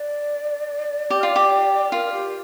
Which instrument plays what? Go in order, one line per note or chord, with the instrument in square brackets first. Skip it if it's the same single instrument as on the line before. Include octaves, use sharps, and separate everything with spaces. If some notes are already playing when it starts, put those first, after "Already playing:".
Already playing: [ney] D5
[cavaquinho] G4
F4
G4
[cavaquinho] F4 [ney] A#4
[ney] G4